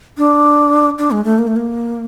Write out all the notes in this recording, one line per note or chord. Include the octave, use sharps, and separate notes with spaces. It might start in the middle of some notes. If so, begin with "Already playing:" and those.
D4
D4
G#3
A3
A#3
A3
A#3